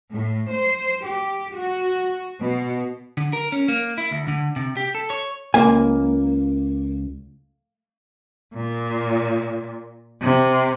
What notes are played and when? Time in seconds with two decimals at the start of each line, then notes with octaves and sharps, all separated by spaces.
0.12 A2
0.51 C5
1.05 G4
1.55 F#4
2.40 B2
3.17 D3
3.33 A#4
3.52 C#4
3.68 A#3
3.98 E4
4.11 D2
4.28 D3
4.56 C3
4.77 G4
4.95 A4
5.10 C#5
5.54 C#2 A#3 G#5
8.56 A#2
10.22 C3